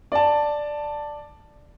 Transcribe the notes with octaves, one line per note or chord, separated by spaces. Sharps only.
D5 A5